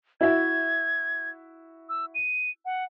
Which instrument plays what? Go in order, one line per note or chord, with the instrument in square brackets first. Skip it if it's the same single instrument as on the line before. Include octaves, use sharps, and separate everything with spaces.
[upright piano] E4 F#4 E5 [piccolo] G#6
[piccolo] E6
D#7
F#5